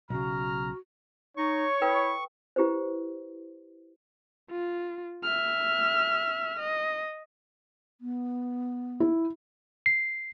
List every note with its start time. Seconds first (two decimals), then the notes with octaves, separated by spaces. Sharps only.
0.10 B1 C#3 F#4 A#5 F6
1.37 D#4 C#5 C#6
1.82 E4 A4 B4 G5
2.56 E4 G4 B4 C5
4.50 F4
5.23 E5 F6
6.59 D#5
8.01 B3
9.00 E4
9.86 C7